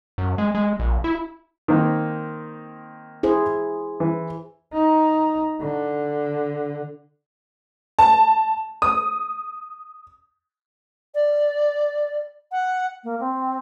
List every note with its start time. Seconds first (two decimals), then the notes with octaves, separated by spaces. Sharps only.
0.18 F#2
0.38 G#3
0.55 G#3
0.79 A#1
1.04 E4
1.68 D#3 A#3 C4
3.23 E4 G#4 C5
4.00 E3
4.74 D#4
5.61 D3
7.99 A5
8.82 D#6
11.14 D5
12.51 F#5
13.04 A#3
13.19 C4